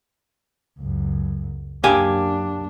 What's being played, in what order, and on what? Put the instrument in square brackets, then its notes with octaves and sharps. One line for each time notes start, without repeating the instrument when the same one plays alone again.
[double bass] C#2 F#2
[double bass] F#2 D4 [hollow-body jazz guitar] A#3 G4 G#5